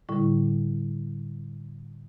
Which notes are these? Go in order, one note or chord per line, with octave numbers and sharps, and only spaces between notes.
A2 D3 G3 E4